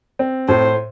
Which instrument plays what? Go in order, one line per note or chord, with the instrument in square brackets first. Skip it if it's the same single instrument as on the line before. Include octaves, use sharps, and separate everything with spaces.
[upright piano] C4
[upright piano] A2 [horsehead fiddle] C5